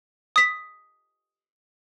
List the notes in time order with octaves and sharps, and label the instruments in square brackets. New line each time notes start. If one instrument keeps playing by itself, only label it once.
[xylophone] D#6 B6